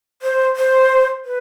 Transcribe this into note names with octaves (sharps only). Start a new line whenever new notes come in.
C5
C5
B4